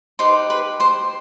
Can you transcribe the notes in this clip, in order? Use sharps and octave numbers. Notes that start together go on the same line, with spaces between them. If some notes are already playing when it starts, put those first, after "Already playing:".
D#4 G4 B4 C5 C6
B4 B5
C5 C6